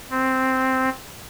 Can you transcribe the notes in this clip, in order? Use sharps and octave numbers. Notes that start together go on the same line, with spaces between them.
C4